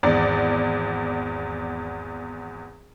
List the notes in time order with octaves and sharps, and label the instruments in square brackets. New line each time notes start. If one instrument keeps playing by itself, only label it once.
[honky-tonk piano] G#1 E2 D5